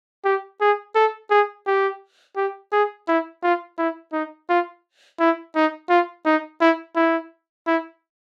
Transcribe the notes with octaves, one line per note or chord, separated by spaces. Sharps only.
G4
G#4
A4
G#4
G4
G4
G#4
E4
F4
E4
D#4
F4
E4
D#4
F4
D#4
E4
E4
E4